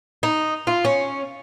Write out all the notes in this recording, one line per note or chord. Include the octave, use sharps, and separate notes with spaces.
D#4
F4
C#4